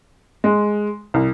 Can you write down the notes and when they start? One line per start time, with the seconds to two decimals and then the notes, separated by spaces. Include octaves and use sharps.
0.44 G#3
1.14 C2